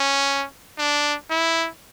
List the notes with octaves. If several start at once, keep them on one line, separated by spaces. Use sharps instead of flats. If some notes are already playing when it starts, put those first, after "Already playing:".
Already playing: C#4
D4
E4